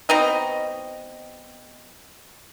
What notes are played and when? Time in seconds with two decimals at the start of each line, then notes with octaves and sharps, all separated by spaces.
0.09 B2 C4 D#4 D#5